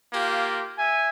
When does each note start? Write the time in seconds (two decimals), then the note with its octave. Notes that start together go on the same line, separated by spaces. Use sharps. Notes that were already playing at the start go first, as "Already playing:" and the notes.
0.13 A#3 F4 G4
0.78 E5 G#5